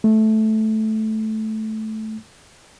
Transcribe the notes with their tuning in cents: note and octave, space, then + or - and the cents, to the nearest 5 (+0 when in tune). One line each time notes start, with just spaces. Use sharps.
A3 -10